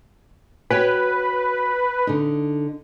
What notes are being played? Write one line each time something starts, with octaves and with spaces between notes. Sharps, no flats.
F#4 B4 C#5 G5
D3 D#4